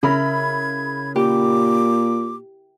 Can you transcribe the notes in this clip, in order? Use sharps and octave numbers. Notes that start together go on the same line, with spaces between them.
C#3 E4 A#4 B5 G#6
A#2 G4 D6